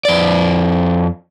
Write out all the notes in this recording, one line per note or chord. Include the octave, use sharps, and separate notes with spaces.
F2 D5